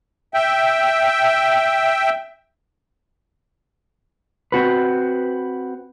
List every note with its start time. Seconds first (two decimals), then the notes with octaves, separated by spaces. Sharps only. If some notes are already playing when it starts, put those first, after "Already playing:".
0.34 E5 G5
4.52 C4 F#4 B4